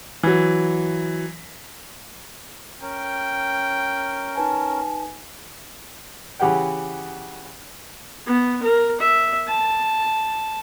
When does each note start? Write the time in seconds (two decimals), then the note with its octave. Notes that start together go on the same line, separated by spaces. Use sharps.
0.23 E3 F#3
2.81 C#4 A#4 G5
4.36 D#4 B4 G#5 A5
6.40 C#3 E3 G4 F#5 G5
8.26 B3
8.62 A#4
9.01 E5
9.48 A5